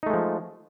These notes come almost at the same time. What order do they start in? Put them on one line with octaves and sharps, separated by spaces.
D#4 A3 G#3 F3